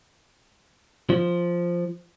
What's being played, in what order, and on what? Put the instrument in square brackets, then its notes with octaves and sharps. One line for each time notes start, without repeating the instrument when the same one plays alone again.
[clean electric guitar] F3